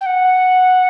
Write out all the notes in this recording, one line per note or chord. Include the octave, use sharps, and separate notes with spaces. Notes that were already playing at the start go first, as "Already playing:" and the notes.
G5
F#5